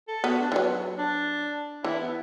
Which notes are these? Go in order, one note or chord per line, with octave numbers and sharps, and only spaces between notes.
A4
B3 F#4
D4
E3 D4
F#3 B3
D4
E3 E4
B3